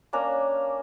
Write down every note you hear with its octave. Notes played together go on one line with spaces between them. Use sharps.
A#3 C#4 D4 A#5